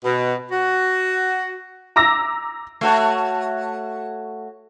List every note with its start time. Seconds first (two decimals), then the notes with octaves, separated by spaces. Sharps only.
0.04 B2
0.52 F#4
1.96 A#5 D6 E6 A#6
2.81 A3 F#4 C#5